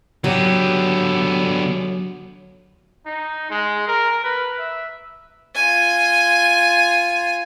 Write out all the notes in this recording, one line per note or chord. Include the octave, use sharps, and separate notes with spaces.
D3 F#3 B3 G4
D#4
G#3
A#4
B4
E5
F4 G#5